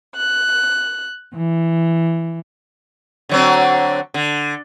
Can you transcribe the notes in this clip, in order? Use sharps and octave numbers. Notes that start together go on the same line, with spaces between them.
F#6
E3
D3 F#3 C4
D3